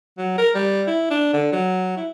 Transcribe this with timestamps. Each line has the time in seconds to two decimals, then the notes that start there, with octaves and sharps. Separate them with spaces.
0.18 F#3
0.38 A#4
0.54 G3
0.87 E4
1.10 D4
1.33 D3
1.52 F#3
1.97 E4